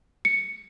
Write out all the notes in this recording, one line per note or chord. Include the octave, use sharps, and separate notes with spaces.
C#7